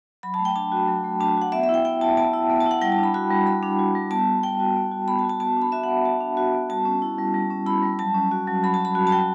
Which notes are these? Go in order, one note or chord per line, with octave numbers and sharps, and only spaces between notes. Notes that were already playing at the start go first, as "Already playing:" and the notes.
F#3 B5
A5
A3
G5
D4 A5
F#4
F#3
A3
D4 A5
F#4 F#5
B3 E5
E5
E4
G5
B3 G5
E4 A5
B3 A5
E4
B3
A5
E4 F#5
G3 G5
A5
D4
B5
F#4 B5
G3
G3 B5
D4
F#4
G3
B3 A5
F#4
B3 G5
F#4
B3
F#4
B3 B5
A5
F#4
A5
B3 A5
D4 B5
F#4 E5
F#5
B3
B3 A5
D4
F#4
B3
G3 A5
C#4
E4
G3
G3
C#4
E4 B5
G3
F#3 A5
C#4
F#4
F#3
F#3 B5
A5
C#4
B5
F#4
A5
F#3 G5